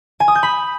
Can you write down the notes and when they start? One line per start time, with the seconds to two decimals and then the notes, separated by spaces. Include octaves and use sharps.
0.20 G#5
0.28 D#6
0.35 G6
0.43 B5